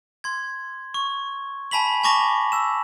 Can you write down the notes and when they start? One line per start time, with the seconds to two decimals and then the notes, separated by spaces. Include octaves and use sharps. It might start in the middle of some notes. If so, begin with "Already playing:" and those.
0.24 C6 G#6
0.94 C#6
1.71 G#5 A5 B5 B6 F#7
2.04 G#5 A5 C#6 D6 A#6 F7
2.52 E6 E7